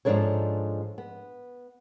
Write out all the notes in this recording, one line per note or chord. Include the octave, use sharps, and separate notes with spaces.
G#2 C#3 F3 D4 A4 C#5
B3